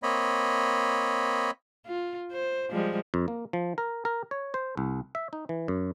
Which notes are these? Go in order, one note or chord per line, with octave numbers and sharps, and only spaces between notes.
A#3 C4 C#5 D#5 B5
F4
C5
F3 G3 G#3
F2
A#3
F3
A#4
A#4
C#5
C5
C2
E5
D#4
E3
F#2